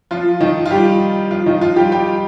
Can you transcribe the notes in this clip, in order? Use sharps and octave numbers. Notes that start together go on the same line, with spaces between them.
F3 F4
D#3 D#4
F4
G3 G4
F3 F4
D#3 D#4
F3 F4
G3 G4
G3 G4